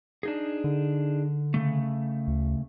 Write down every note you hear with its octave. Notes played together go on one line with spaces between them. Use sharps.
D4 D#4 G#4
D3
C#3 A3
D2